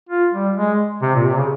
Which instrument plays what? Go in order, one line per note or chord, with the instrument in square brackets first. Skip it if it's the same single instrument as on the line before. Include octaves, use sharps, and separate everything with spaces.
[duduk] F4
G3
G#3
C3
A#2
C3
C#3